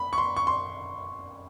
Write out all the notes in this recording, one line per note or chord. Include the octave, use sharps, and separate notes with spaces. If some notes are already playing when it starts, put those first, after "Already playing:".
Already playing: B5
C#6
C6
C#6
C6